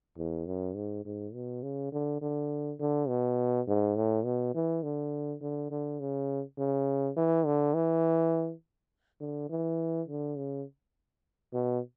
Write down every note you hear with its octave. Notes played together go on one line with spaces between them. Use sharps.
E2
F#2
G#2
G#2
B2
C#3
D3
D3
D3
B2
G#2
A2
B2
E3
D3
D3
D3
C#3
C#3
E3
D3
E3
D3
E3
D3
C#3
B2